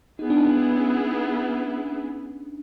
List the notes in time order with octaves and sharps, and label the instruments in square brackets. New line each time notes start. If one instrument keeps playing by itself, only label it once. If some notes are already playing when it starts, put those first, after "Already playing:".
[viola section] B3 E4 G#4 [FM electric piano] D#4
[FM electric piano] D4
D#4
D4
C#4